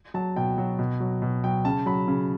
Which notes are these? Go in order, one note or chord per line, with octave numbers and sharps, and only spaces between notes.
F#3 A5
B2 G5
F#3
B2
F#3
B2
F#3 G5
C#3 A5
F#3 B5
C#3